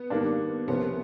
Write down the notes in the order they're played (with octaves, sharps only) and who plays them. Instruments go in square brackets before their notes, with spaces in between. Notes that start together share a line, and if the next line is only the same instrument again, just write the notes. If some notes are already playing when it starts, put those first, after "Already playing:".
Already playing: [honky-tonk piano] B3
[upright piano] G#2 D#3 G3 A#3 D4
[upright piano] C2 C3 F3 A#3 C#4 [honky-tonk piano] B3